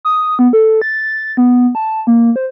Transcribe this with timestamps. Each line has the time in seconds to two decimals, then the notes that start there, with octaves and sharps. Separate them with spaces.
0.05 D#6
0.39 B3
0.53 A4
0.82 A6
1.37 B3
1.75 A5
2.07 A#3
2.36 C5